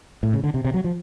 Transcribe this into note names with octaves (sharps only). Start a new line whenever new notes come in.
A2
C#3
D3
C3
C3
F#3
F3